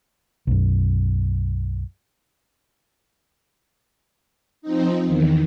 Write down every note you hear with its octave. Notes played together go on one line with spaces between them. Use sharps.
B1 F#2
F3 C4 D#4
E2 D#3